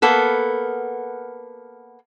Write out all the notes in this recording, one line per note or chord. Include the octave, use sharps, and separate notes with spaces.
A#3 B3 A4